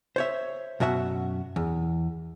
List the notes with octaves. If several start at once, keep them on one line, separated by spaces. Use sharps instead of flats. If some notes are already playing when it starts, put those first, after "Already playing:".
C5 C#5 E5
F#2 B2 F#4 E5 F#5
E2